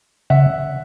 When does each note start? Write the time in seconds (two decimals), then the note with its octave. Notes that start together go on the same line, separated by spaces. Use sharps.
0.30 C#3 E5 F#5